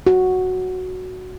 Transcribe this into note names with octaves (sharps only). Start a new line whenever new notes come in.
F#4